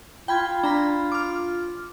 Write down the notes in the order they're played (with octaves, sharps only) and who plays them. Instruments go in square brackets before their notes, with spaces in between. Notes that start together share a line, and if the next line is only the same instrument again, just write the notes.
[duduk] F4 [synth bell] G5 B5 G#6
[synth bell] D4 A#5 B5
D6 F6